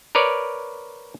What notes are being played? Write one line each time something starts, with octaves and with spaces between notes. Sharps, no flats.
A#4 B4 C#5 D5